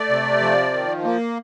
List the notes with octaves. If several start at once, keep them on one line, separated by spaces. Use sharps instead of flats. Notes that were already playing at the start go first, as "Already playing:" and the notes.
Already playing: A3 D5
C3
F3
D#3
A#3